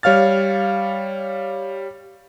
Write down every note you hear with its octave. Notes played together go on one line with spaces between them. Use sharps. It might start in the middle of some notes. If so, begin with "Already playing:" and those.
G3 C#5 F5 F6 A6